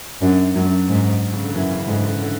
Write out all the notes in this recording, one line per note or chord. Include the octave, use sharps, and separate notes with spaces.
F#2 D4
F#2 F#3
G#2
C#3
D3
F#2 E3
C#3
G#2 D3
D3
D3